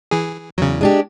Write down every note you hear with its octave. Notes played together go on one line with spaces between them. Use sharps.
E3 G#4
E2 C#3 F#3
G#3 D4 G4